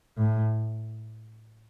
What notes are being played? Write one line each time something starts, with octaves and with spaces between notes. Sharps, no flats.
A2